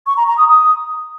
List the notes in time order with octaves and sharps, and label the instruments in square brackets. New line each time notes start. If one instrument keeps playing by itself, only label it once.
[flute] C#6
A#5
A#5
D#6
D#6